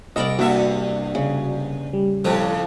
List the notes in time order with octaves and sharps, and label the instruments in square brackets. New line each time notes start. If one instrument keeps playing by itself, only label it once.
[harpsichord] C2 B5 [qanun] A4 A#4 D5 [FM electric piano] D#5
[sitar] G2 B3 E5 [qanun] A#3 [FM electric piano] F#4
[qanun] C#3
[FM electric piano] G3
[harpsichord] F2 F3 G5 [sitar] A2